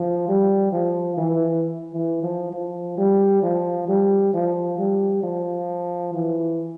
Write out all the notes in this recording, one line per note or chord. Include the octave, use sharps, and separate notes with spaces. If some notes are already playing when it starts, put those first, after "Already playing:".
Already playing: F3
G3
F3
E3
E3
F3
F3
G3
F3
G3
F3
G3
F3
E3